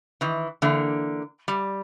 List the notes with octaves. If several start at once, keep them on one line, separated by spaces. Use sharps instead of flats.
D#3 E3
D3 E3 A#3
G3